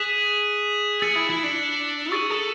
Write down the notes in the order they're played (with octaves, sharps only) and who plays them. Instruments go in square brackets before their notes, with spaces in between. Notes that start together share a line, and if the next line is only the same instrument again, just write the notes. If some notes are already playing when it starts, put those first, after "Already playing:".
Already playing: [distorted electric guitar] G#4 [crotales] F#6 B6 E7
[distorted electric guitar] G#4 [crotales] E6 A6 C#7 F#7
[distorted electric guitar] E4
E4
D4
[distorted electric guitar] G#4 [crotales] C#6 E6 A6
[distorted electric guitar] A4